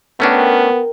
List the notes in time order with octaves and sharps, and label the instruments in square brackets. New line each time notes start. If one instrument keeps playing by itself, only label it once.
[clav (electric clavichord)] A3 C#4 D4 [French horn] B3 [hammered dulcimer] A#4 G5